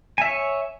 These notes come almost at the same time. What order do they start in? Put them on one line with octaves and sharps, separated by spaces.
G#5 E5 C#5